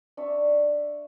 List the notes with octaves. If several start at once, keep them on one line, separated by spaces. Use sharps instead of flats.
D4 E5 C#6